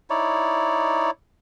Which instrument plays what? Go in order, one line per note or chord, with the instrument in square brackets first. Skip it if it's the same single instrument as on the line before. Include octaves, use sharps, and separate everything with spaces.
[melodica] D#4 E4 C#5 D5